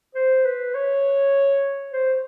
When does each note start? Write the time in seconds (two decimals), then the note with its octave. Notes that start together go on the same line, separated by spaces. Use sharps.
0.15 C5
0.45 B4
0.75 C#5
1.93 C5